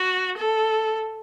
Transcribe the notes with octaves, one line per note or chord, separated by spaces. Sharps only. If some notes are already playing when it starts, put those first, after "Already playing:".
Already playing: F#4
A4